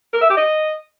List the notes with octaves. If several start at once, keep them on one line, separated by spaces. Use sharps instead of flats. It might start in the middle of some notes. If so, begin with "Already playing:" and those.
A#4
E5
G4
D#5